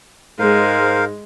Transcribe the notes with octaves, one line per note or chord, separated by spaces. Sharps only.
G#2 G#3 A#4 C5 F5